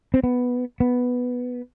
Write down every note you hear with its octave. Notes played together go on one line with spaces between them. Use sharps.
C4
B3
B3